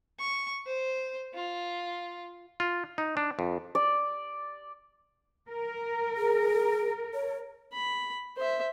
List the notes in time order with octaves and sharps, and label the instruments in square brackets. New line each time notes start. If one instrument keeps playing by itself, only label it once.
[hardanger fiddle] C#6
C5
F4
[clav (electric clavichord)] F4
D#4
D4
F2
[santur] D5
[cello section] A#4
[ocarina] G#4
C#5
[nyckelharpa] B5
C5 E5